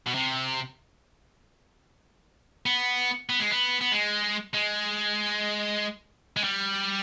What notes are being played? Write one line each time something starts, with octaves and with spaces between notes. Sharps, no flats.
B2
C3
B3
B3
G#3
B3
B3
G#3
G#3
G#3
G3